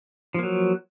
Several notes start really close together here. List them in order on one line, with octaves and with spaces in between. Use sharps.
F3 A#3 F#3